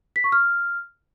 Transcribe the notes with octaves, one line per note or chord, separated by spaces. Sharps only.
B6
C#6
F6